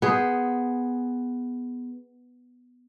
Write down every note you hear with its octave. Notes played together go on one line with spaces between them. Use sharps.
B3 G#4 C5